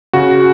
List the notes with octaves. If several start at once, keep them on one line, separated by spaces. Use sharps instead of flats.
C#3 F#4